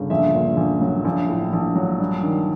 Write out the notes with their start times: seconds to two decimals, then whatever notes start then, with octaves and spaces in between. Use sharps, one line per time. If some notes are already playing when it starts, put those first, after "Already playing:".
Already playing: G1 C#3
0.10 A#1 E5
0.33 A#2
0.57 A#1
0.81 F#3
1.05 A#1
1.29 A2
1.53 A#1
1.75 F#3
2.00 G2
2.23 D#3